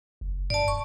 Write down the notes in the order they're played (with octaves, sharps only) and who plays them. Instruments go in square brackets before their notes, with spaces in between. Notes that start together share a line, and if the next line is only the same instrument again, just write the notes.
[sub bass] F#1
[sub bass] G2 [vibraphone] D5 A5
[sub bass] D#1 [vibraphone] C#6